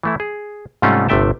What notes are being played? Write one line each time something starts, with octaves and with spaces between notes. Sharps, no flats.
E3 A3 E4
G#4
G#2 C3 G3 A3 C#4 F4
G1 C3 A3 E5 G5 A5